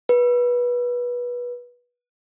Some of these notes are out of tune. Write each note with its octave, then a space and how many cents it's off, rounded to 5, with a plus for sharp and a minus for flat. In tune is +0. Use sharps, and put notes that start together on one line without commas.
B4 -20